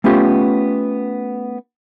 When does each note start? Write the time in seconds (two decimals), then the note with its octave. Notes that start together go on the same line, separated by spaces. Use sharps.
0.04 A3 B3 C#4 F4 G4